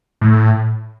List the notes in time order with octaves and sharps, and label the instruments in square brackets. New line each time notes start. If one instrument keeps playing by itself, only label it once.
[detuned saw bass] A2